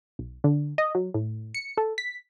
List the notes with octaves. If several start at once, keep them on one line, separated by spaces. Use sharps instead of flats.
B1
D3
D#5
F#3
A2
C#7
A4
B6